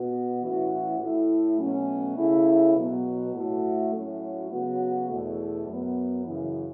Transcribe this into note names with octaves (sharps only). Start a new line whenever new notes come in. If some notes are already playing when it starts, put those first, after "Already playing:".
Already playing: B2 B3 F#4
A2 E3 C#4 F#4
A2 A3 E4
B2 F#3 A3 C#4
C#3 A3 C#4 E4
B2 F#3 B3
A2 A3 F#4
A2 F#3 C#4 F#4
C#3 F#3 B3 F#4
E2 B2 A3
F#2 F#3 B3
F#2 C#3 E3